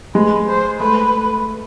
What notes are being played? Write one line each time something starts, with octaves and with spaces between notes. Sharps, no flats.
G#3 B4
C5
A3 B4